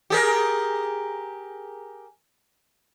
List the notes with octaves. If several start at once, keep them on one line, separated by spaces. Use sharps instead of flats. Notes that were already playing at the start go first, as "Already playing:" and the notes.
G4 G#4 A#4